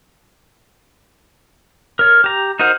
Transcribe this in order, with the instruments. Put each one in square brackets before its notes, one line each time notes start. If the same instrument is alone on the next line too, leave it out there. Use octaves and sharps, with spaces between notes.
[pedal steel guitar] A#4 C#5
G4 A#5
D#4 F#4 A#4 C5 F#5